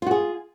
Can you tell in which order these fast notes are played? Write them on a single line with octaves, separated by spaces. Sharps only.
F4 F#4 G#4